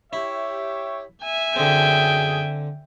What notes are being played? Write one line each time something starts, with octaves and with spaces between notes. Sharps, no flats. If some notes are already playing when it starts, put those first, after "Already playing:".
E4 G4 C#5 E5
E5 G#5
F#2 D3 C4 G#4 G5